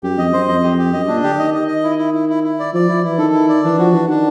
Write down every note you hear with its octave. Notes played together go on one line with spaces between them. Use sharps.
F#2 G4
F2 D#5
F#2 C5
F2 D#5
G4
G4
F#2 D#5
A#2 D4
D3 G4
D#3 D#5
D#5
D#5
E4
E4
E4
E4
E4
D5
F3 D5
F3 E4
E3 E4
D#3 A4
E4
D5
E3 D4
F3 F#4
E3 D4
D#3 D4